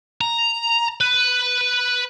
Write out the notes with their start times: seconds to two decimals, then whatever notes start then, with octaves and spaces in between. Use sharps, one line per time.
0.21 A#5
1.01 B4